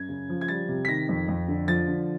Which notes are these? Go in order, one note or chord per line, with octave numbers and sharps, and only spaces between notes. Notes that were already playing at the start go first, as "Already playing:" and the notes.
Already playing: F#2 G#6
C#3
F3
G#6
G3 A6
C3
B6
D#3 A#6
F2
F2
D3
F3 A6
D3